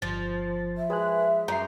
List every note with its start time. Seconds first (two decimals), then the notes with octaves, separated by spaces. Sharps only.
0.02 G1 F3 A6
0.77 E5
0.90 G#3 B4 G#5 F#6
1.48 F#2 A#5 G6 C7